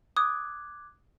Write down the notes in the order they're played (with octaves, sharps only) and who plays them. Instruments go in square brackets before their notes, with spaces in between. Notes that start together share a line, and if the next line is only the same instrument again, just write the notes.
[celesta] D6 F#6 G#6 [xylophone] D#6